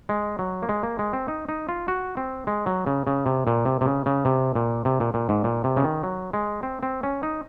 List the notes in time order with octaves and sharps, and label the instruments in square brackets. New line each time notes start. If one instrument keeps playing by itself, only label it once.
[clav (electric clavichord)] G#3
F#3
A#3
G#3
A#3
G#3
C4
D#4
D#4
F4
F#4
C4
G#3
F#3
C#3
C#3
C3
A#2
C3
C3
C#3
C#3
C3
A#2
C3
A#2
A#2
G#2
A#2
C3
C#3
D#3
F#3
G#3
C4
C4
C#4
D#4